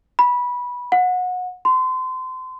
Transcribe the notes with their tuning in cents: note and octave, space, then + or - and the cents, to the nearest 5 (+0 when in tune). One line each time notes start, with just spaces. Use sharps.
B5 -15
F#5 -25
C6 -30